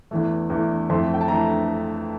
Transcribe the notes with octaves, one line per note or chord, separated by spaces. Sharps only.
E2 E3 A3
E2 E3 A3
F2 E3 A3 C6
G5
A5
E3 A3 A#5